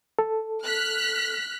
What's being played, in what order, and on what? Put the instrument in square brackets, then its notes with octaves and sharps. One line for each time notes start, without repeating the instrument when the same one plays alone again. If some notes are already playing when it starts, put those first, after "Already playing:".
[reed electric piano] A4
[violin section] F6 F#6 B6